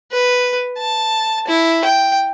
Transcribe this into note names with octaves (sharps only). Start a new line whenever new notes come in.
B4
A5
E4
G5